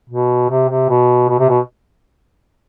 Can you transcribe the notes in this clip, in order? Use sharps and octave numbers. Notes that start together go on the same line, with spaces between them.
B2
C3
C3
B2
B2
C3
B2